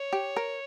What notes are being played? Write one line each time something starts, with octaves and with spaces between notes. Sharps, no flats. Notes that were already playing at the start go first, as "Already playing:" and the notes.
Already playing: C#5
G4
A#4